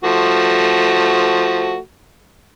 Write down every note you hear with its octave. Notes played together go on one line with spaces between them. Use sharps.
F3 A3 F#4